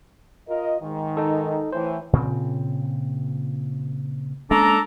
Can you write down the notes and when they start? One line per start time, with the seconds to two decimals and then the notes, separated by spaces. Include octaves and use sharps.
0.48 F4 A#4 D#5
0.81 G#2 D#3
1.17 D#4 A4
1.73 A2 E3 C5
2.13 A#2 C#3 C4
4.51 G#3 A#3 C#4 D4 A4 A#5